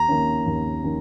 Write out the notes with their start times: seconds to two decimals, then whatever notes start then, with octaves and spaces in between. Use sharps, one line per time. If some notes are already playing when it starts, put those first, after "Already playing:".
Already playing: D#2 A#5
0.08 D#3 A#3 C#4
0.46 D#2
0.84 D#3 A#3 C#4